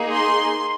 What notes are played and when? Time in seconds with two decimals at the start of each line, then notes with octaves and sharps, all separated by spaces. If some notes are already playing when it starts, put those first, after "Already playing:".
Already playing: A#3 D#4 G#4
0.13 C6